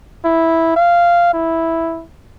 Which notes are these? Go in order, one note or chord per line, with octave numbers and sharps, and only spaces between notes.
E4
F5
E4